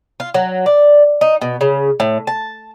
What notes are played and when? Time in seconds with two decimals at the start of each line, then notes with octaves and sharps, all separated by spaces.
0.20 F4
0.34 F#3
0.66 D5
1.21 D#4
1.41 B2
1.61 C#3
2.00 A2
2.27 A5